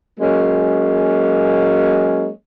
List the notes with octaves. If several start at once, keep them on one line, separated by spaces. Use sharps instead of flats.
F#3 G#3 A#3 C#4